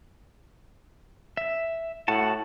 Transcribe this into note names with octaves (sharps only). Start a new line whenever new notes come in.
E5
A2 F#4 F#5 A5